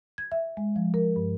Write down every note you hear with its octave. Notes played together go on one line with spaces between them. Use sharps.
G#6
E5
G#3
F3
A#4
G2